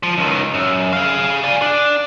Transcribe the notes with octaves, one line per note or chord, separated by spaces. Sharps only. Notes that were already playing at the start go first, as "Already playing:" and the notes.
F3
C#2 D#3
F#2
G#4 F5
D5 G#5
D4